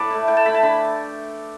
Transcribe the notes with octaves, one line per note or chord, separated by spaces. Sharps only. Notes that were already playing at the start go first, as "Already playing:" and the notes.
Already playing: A2 A4 B4 D5
A3 E4
A2 G5
A5
A3 E4 B5
A5
D3 B5